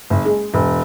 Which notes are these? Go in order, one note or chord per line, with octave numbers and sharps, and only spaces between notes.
F#1
G#3
E1